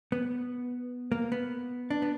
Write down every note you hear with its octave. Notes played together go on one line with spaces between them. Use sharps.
B3
A#3
B3
D4
B3